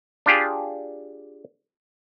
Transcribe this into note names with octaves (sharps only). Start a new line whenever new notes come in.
D4 F4 G4 G#4